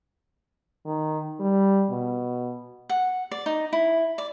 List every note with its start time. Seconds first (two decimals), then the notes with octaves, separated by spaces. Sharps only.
0.85 D#3
1.40 G3
1.90 B2
2.89 F#5
3.31 D5
3.46 D#4
3.73 E4
4.18 D5